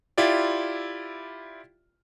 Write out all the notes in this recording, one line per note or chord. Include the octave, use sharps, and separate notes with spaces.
E4 F4 G4 D5